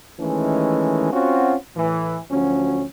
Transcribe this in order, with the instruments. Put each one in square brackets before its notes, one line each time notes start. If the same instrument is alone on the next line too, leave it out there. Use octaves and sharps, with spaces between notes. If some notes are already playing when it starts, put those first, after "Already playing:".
[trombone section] D#3 E3 G#3 A3 C#4
C4 C#4 F4 F#4
A2 E3
D2 F3 F#3 C#4